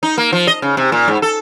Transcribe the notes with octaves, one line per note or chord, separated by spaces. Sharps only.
D#4
A#3
F3
D#5
C#3
C3
A#2
G#2
A4